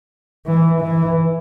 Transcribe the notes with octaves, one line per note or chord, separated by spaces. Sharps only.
E3
E3